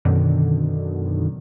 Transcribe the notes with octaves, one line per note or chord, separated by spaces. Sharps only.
F#2 B2 D3 D#3